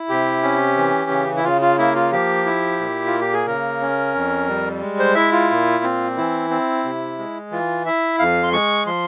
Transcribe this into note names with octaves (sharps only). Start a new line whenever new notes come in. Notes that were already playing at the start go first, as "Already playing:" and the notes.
Already playing: E4
C3 G4
C#4
E3
C#3
E4
C#3 F4
F4
A#3 E4
F4
F3 G4
E4
A#2
F4
A#3
G4
G#4
C#3 A#4
C#4
F2
G3
G#3
C5
E4 E5
F4
A#2
C4
E3 E4
C4
C3
G#3
E3 F4
E4 E5
F2 F5
C6
G#3 C#6
F3 C6